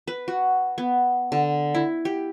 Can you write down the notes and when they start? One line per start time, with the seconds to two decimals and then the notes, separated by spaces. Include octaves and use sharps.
0.08 B4
0.28 F#4
0.78 B3
1.32 D3
1.75 E4
2.05 G4